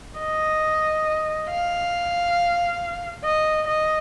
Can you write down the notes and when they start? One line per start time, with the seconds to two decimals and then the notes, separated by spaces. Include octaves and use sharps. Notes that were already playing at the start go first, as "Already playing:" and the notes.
0.20 D#5
1.50 F5
3.24 D#5
3.67 D#5